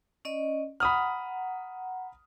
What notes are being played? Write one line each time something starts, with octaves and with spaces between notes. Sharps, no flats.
C#4 D5 D#5
F#5 A#5 B5 D#6 F6